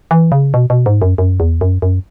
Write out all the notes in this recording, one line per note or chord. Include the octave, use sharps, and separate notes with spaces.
E3
C#3
B2
B2
G#2
F#2
F#2
E2
F#2
F#2